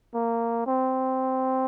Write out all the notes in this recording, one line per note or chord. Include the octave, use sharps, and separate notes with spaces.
A#3
C4